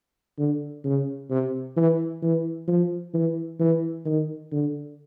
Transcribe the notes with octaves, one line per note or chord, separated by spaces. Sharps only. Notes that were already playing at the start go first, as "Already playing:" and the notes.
D3
C#3
C3
E3
E3
F3
E3
E3
D#3
D3